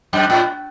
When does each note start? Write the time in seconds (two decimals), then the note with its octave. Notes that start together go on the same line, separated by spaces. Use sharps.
0.13 F#2
0.30 A2